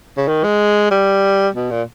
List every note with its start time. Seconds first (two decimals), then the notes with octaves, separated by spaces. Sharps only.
0.17 C#3
0.28 D#3
0.44 G#3
0.91 G3
1.55 B2
1.71 A#2